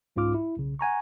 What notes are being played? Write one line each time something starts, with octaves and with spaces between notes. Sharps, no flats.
C2 G#2 C#4 F4 D6 F6
E4
B1 C#3
F#5 G#5 A#5 C#6